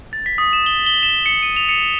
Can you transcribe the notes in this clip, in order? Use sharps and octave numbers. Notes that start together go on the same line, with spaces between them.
A6
B6
D#6
E7
G7
G7
E7
C#7
D#7
F7
C#7